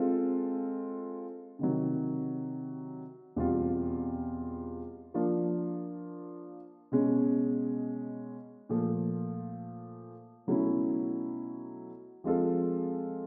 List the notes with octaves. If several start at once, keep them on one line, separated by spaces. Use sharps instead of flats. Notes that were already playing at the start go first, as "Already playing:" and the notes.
Already playing: G#3 C4 F4 A4
C3 D#3 F#3
E2 B2 G3 C4 F4
F3 A#3 D4 F4
B2 G#3 C#4
A#2 F3 A3
B2 F#3 A3 C#4 E4
F3 G#3 C4 F4 A4